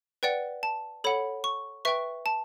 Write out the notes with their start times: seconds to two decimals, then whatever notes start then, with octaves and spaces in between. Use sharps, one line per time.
0.23 B4 D5 F#5 G5
0.63 A5
1.04 A4 C#5 F#5 B5
1.44 C#6
1.85 B4 E5 G5 C#6
2.26 A5